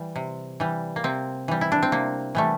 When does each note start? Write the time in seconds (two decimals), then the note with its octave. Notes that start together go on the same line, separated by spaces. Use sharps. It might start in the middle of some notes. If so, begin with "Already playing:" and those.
Already playing: E3 G3
0.16 C3
0.60 E3 G3
0.96 A#3
1.04 C3 C4
1.48 E3 G3
1.61 E4
1.72 D4
1.83 C4
1.92 C3 A#3
2.35 E3 G3 A3